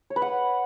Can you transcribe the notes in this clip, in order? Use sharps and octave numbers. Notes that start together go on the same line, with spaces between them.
C#5
B4
F#5